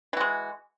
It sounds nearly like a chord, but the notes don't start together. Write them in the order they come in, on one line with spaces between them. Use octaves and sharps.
E3 F#4 G#3